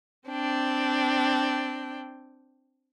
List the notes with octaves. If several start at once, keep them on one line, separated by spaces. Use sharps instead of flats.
C4 D4 G5